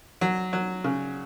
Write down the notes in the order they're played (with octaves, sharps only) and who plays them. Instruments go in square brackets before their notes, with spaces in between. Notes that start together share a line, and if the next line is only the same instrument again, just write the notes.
[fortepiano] F#3
F#3
C#3